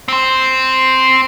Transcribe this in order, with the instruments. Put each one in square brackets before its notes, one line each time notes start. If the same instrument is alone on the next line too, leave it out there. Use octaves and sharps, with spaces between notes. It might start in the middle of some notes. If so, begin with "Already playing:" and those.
[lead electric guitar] C4 C5